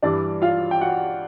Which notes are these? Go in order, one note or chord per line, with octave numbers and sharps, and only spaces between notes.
G2 E3 G3 D4 D5
F4 F5
G5
F#4 F#5